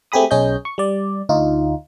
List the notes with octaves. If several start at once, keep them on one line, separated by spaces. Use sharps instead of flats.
A3 C4 G4 G#4 B5 D#6
B1 C#4 G#4 C#5 D#5 G6
C#6
G3 D5
D2 D#4 F4